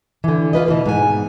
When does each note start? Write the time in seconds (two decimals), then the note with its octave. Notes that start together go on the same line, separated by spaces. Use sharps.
0.24 D3 E3
0.53 F4 B4 D#5
0.68 B2 E3
0.86 G#2 B2 G#5